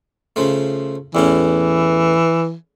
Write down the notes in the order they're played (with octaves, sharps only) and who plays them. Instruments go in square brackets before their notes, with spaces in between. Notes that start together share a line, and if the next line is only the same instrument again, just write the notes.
[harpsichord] C#3 F3 A3
[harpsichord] E2 A2 C#4 [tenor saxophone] E3